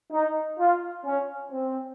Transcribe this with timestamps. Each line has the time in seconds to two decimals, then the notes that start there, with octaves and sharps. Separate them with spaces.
0.12 D#4
0.59 F4
1.05 C#4
1.52 C4